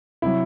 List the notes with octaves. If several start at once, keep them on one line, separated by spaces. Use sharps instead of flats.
C3 F#3 E4